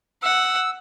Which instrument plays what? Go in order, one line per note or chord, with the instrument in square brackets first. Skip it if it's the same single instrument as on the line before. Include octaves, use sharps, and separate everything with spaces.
[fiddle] F#5 [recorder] E6